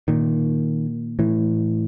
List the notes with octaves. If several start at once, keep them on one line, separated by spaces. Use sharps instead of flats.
A#2 D#3
A2 E3